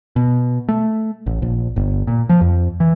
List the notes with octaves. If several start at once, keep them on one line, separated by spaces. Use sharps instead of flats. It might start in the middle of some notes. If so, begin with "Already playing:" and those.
B2
A3
A1
A#1
G1
A#2
F3
F2
E3